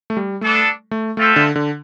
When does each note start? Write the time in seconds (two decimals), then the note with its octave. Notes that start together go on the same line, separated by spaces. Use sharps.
0.10 A3
0.17 G3
0.41 A3 B3 D4 A4
0.91 A3
1.17 A3 C4 F4 A4 E5 G5
1.36 D3
1.56 D3